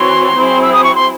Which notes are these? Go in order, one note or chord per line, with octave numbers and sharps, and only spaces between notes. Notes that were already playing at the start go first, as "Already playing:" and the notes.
Already playing: E3 C4 F#4 C#5 C6
F#3 C4 E4 G#4 C5
E6
D#6
C#6
C6